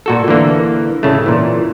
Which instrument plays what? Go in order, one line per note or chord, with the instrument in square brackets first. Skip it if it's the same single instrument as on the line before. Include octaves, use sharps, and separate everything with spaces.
[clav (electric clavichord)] A#2 F#4 A4
D3 E3 A#3
A2 C#3 A3
A#2 E3